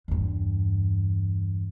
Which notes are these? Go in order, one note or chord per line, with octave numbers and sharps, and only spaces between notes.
E2 G2